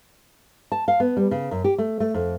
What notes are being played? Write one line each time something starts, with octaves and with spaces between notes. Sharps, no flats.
A5
F5
B3
G3
C#3
F#2
G4
A3
A3
F2